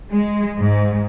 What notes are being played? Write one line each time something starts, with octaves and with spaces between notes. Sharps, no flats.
G#3
G#2